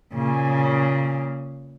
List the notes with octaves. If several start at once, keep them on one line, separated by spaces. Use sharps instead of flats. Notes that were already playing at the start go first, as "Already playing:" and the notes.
A#2 C#3